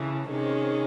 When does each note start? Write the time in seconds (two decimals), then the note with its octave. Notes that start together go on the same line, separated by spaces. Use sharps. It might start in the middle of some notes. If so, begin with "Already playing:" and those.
Already playing: C#3 E3 A3
0.28 C3 D#3 G#3 C#4